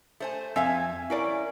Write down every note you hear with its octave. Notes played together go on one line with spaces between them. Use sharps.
A3 C5 G#5
F2 C4 E5 F5 G#5
C#4 E4 A#4 D5